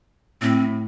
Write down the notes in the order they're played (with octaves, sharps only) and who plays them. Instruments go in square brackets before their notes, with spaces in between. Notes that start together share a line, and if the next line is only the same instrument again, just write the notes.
[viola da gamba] A2 [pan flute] C4